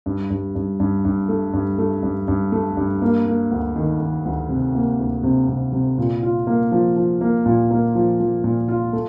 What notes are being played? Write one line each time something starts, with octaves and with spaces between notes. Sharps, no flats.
G2
G2
G2
G2
G2
A3
G2
A3
G2
G2
A3
G2
A#3
A#3
D2
D#3
D#3
D2
C3
A#3
D2
C3
C3
C3
A#2
F4
A#3
F3
F3
A#3
A#2
A#3
F3
F3
A#2
F4
A3